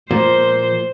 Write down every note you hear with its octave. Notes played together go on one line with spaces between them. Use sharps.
A#2 F3 C5